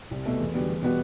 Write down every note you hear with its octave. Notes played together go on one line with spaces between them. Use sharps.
C2
B2 A3
E2
D3 G3 B3 F#4
E2
B2 G3 B3 F#4